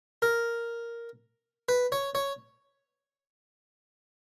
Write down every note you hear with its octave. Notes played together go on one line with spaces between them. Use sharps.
A#4
B4
C#5
C#5